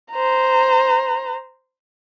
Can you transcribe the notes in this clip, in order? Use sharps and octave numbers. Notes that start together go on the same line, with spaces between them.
C5 A#5